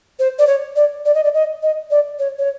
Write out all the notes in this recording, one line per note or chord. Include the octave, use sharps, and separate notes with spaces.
C5
D5
C#5
D5
D5
D#5
D5
D#5
D#5
D5
C#5
C#5